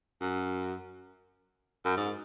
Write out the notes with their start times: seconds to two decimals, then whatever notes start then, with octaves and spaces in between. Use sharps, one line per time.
0.21 F#2
1.85 F#2
1.97 G#2